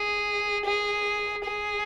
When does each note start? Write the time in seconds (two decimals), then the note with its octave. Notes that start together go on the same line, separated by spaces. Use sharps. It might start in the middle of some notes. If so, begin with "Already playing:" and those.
Already playing: G#4
0.65 G#4
1.44 G#4